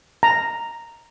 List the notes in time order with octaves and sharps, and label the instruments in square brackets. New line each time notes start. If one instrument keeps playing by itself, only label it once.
[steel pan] A#5